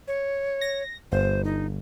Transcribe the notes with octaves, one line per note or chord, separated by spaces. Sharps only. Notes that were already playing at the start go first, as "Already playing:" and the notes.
C#5
A#6
G1 C5
D#4